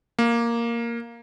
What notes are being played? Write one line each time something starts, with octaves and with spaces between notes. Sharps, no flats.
A#3